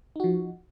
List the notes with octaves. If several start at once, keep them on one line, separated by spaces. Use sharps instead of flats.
F3 D#4 F#4